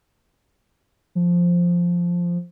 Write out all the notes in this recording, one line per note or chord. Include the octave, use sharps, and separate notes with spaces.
F3